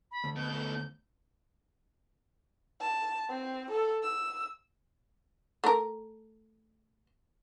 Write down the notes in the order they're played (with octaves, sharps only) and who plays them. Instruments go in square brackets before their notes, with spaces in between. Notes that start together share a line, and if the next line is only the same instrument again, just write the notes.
[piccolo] B5
[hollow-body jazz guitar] D2
[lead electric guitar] B2 [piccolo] G6
[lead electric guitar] B2 A3
[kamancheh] A5
C4
A4
E6
[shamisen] A3 A#4